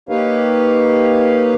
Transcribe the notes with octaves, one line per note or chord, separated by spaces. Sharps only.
A#3 D#4 G4 B4 C#5 F5